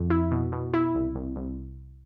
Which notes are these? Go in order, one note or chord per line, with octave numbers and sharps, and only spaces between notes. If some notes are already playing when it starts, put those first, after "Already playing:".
Already playing: F2
E4
B2
B2
E4
C2
C2
C2